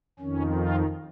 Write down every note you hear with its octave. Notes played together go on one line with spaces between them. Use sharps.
F2 D#3 C#4
F4